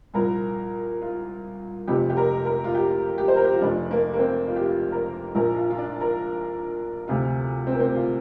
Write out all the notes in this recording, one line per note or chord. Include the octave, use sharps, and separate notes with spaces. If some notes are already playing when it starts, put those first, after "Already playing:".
C2 A#2 F3 A#4
F4
F1 F2 C3 F3 G4
G4
A#4
A#4
F4
G4
G4
C5
A#4
G4
F4
F1 F2 F3 D4
A#3
A#3
C4
F4
G4
F4
A#4
A#1 A#2 F3 A#4
F4
F4
D4
A#4
D2 C3 F3 F4
C4
A#3
C4
F4